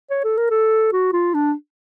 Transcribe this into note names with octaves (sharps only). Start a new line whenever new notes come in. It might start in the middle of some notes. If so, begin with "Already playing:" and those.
C#5
A4
A#4
A4
F#4
F4
D4